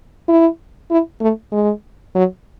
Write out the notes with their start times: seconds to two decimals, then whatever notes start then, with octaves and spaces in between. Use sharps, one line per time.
0.29 E4
0.91 E4
1.21 A3
1.52 G#3
2.15 F#3